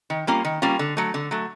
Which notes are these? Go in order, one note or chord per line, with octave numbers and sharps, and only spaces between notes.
D#3
G3 A#3 C#4 F4
D#3
G3 A#3 C#4 F4
D3
F#3 A3
D3
F#3 A3